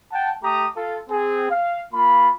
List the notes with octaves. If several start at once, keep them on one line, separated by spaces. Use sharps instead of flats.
F#5 G5 A5
A3 G4 A#5 D#6
F4 A4
C4 G#4
F5
A#3 F4 B5